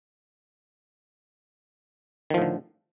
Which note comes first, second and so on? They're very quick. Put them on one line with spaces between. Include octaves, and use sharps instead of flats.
D#3 F3 A2 D3